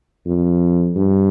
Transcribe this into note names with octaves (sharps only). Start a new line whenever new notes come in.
F2
G2